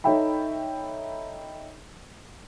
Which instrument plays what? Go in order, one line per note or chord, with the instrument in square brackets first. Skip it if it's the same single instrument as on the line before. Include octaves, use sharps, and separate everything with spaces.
[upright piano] D#4 A4 C#5 E5 G5 B5